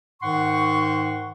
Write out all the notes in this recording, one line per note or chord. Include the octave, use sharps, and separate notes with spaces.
G#2 D#3 F#5 C6 C#6